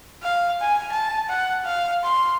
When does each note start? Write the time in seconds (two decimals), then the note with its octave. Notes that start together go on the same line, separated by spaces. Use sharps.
0.23 F5
0.61 G#5
0.91 A5
1.28 F#5
1.65 F5
2.04 C6